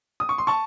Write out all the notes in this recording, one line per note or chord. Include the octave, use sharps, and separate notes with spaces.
D#6
C#6
C6
A5 C#6